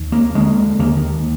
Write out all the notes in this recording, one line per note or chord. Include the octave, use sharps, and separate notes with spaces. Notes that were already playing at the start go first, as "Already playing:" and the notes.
Already playing: D#2
A#3
D3 G#3
D#2 A#3